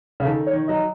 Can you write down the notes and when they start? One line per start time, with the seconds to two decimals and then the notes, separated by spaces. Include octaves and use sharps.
0.20 C#3
0.25 D#3 A4
0.47 C#5
0.53 D#3
0.68 F#3 D#5